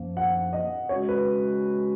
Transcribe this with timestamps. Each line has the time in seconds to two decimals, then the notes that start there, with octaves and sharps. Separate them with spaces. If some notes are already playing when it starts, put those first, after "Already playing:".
Already playing: F#2 F3 A#3
0.17 F#5
0.53 D#5
0.89 C#3 G#3 C#4 F#4 C#5
1.09 B4